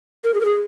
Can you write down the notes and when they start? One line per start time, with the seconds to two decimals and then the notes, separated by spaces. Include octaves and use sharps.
0.24 A#4
0.34 G#4
0.41 A#4
0.45 G#4